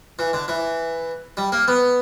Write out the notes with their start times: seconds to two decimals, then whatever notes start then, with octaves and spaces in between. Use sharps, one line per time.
0.19 E3
0.33 D3
0.48 E3
1.37 G3
1.52 A#3
1.68 B3